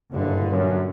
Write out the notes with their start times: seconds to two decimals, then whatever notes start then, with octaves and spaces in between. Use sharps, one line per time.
0.12 F#1 G2 A#2 D3
0.52 F#2